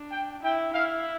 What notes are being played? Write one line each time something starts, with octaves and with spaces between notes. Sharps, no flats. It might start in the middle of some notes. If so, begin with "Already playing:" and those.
Already playing: D4
G5
E4 G5
E4 F5